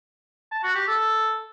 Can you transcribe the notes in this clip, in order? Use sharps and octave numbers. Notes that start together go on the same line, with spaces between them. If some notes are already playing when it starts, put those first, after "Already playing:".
A5
F#4
G4
A4